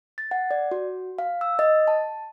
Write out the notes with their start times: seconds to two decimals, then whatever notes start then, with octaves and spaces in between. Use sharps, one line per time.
0.18 A6
0.31 F#5
0.51 D5
0.71 F#4
1.18 F5
1.41 E6
1.59 D#5
1.88 A5